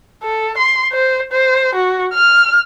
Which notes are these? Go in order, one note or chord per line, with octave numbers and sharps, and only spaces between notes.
A4
C6
C5
C5
F#4
F6